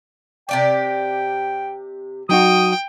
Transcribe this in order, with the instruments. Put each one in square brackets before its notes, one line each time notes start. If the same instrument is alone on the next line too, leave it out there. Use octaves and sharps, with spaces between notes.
[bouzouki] C3 G4 D5 [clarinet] G5
[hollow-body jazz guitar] F#3 D#4 F#4 [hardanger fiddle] G5 [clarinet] D#6